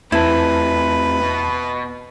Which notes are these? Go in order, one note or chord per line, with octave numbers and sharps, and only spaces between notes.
E2 C3 A3 E4 B4 A5
B2